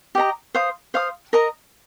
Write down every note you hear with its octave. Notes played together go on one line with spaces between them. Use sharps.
G4 D#5 A#5
C5 F5 D#6
C5 F5 D#6
A#4 D#5 A#5